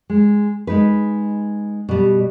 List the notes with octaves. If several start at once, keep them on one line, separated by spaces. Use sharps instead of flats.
G#3
G#3 D#4 B4
B2 G3